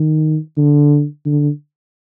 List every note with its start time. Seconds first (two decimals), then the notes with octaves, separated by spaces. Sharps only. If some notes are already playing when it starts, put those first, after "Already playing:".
Already playing: D#3
0.57 D3
1.25 D3